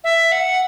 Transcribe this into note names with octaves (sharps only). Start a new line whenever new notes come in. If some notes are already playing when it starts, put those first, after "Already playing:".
E5
F#5